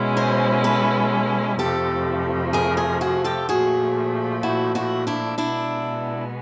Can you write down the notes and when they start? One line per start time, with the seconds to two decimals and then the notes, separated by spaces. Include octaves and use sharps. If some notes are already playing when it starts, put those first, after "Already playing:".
Already playing: B2 G#3 C#4 E4
0.17 A#4 C5
0.64 A4 B4
1.59 F2 C3 F3 A3 G4 A4
2.53 G#4 A#4
2.77 G#4 A#4
3.01 F#4 G#4
3.24 G4 A4
3.49 A#2 F3 A3 F#4 G#4
4.43 E4 F#4
4.75 E4 F#4
5.07 D4 E4
5.38 B2 G#3 B3 D4 E4